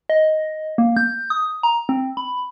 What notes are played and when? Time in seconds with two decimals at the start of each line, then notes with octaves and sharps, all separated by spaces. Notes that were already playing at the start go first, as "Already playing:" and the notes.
0.09 D#5
0.78 A#3
0.97 G6
1.30 D#6
1.63 A#5
1.89 C4
2.17 B5